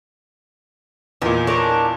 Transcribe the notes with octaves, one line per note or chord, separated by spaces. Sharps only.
E2 A#2 D#3
D4 D#4 A#4 C#5